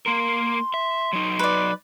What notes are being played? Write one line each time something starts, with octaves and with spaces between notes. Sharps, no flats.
A#3 A#4 C6
E5
F#3 D#4
B4 D5